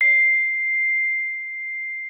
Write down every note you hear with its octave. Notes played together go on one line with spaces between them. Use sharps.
C7